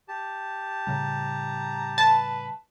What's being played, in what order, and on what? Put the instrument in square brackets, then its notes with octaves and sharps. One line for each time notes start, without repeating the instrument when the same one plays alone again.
[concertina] G4 A5
[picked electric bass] A2 C#3 G3 [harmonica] A#5
[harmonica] B4 [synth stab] A5